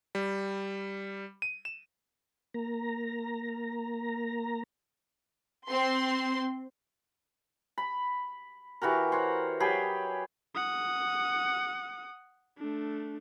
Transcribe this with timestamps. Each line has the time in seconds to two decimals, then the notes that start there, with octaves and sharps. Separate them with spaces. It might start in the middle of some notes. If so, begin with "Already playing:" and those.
0.15 G3
1.42 D#7
1.65 E7
2.54 A#3 A#5
5.67 C4 C6
7.78 B5
8.81 E3 F#4 G4 A#4
9.12 C5 C#5 F#5
9.60 F#3 G4 G#4 B5
10.55 F#5 D#6
12.58 A3 D4